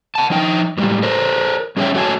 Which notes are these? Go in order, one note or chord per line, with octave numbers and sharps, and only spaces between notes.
F#5 A5
F3 D#4 G5
A2 G3 G#3
A4 A#4 C5
G3 C#4 G#4 C#5 E5 G5
A3 F#4 C#5 G#5 A5